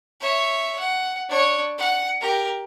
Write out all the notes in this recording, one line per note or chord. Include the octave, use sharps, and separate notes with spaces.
C#5 E5
F#5
D4 C#5
F#5
G4 A#4